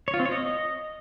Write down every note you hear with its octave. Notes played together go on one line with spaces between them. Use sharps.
C#5
F4
C4
C#5
D#5